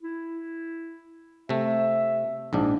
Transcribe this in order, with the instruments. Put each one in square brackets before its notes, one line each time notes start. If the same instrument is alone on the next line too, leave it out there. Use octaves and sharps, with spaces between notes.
[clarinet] E4
[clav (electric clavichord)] C3 A3 [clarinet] E5
[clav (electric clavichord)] A#1 G#2 D4 [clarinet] E4